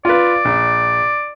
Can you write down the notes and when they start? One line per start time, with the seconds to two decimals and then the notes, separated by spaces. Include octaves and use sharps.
0.05 F4 B4 D5
0.45 A#1